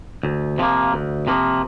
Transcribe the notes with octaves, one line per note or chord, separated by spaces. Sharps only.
D2
C3 F3 A#3
D2
C3 F3 A#3